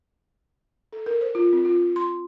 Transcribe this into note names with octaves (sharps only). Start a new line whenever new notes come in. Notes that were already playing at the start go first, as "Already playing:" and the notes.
A4
A#4
C5
F4
C4
F4
C6